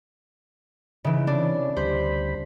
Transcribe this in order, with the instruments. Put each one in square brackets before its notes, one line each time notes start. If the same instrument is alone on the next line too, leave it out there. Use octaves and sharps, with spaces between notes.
[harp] C#3 E3 [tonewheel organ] D#4 E4
[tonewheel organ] C3 C#4 [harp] D4
[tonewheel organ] D2 G3 B5 [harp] C5